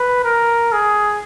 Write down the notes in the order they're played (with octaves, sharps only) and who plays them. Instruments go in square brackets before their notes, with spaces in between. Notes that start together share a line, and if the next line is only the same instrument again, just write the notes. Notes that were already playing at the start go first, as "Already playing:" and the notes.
Already playing: [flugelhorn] B4
A#4
G#4